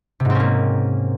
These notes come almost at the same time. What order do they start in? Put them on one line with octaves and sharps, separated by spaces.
C3 G#2 C4 C#4 A#3